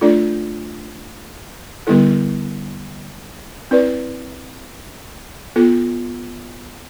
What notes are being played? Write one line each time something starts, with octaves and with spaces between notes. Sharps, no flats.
A3 D4 F4 A4 D5
D3 G3 B3 E4 A4
C4 E4 B4 D5
B3 F4 A4